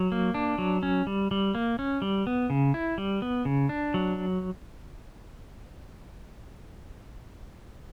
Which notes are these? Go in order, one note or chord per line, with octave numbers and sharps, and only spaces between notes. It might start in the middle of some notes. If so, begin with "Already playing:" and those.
Already playing: F#3
A#3
D4
F#3
C#4
G3
G3
A#3
C#4
G3
B3
C#3
E4
G3
B3
C#3
D4
F#3